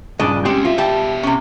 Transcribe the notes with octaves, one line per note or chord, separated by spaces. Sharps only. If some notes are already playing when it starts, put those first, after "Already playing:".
G2 A#2 C#3 D4 D5 D#5
G#3 C4 C#4 G4
B2 F4 E5
G3 G4 A5
C3 C#4